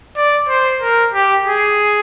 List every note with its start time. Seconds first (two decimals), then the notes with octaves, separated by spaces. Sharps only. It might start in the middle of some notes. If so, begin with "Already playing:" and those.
0.17 D5
0.48 C5
0.82 A#4
1.14 G4
1.46 G#4